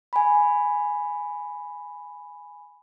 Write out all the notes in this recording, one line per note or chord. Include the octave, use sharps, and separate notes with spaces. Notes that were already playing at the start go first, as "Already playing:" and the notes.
G#5 B5